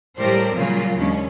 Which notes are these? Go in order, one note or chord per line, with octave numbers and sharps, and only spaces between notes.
A2 G3 G4 A#4 C5 D5
A#2 C#3 F#3 G3 A#3 F4
D#2 G#3 C#4 D4